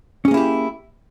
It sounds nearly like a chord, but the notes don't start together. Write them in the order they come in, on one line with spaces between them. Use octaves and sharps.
C#4 G#4 A#3 E4 G4